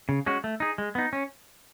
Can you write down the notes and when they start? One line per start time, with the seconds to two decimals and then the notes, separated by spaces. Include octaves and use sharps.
0.09 C#3
0.26 G#3 C#4 F#4
0.44 A3
0.60 D#4 G#4
0.78 G#3
0.95 B3 D#4
1.13 C#4